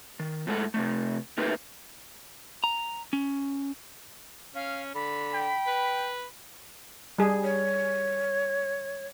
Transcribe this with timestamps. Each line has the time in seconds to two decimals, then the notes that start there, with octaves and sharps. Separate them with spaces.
0.19 D#3
0.47 A2 G#3 A4 F#5
0.74 C3 F3 A3
1.38 A3 A#3 D#4 G4 A#4 B4
2.64 A#5
3.13 C#4
4.55 C#4 F5
4.95 D3 B5
5.34 G5
5.67 B4
7.18 G3 G#4
7.44 C#5